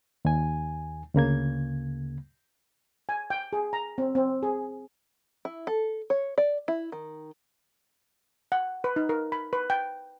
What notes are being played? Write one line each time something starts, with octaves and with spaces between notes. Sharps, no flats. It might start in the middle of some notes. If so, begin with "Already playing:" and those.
D#2 G#5
D2 C#3 A#3 G#6
G#5
G5
G#4
A#5
C4
C4
G#4
E4
A4
C#5
D5
E4
D#3
F#5
B4
D#4
A#4
B5
B4
G5